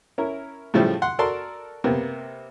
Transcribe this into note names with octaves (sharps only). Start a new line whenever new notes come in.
C#4 E4 A#4
A2 C#3 F3 G3 A3
F#5 C6
F#4 A4 A#4 D5 A5 C6
C3 A#3 B3